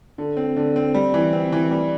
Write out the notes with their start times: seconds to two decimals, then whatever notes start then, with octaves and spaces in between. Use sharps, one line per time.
0.18 D3
0.37 C4
0.56 D3
0.76 C4
0.94 G3
1.14 E3
1.33 C4
1.52 E3
1.71 G3